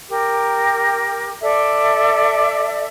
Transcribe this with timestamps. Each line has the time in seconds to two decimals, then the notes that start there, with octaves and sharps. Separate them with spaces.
0.09 G4 A#4
1.41 A4 D5 E5